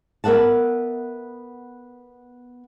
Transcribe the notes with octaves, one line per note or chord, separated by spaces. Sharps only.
B3 A#4 E5 F#5 A5